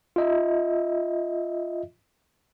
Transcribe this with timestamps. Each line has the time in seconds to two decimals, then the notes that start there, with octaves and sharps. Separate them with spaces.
0.16 F4 D#5 E5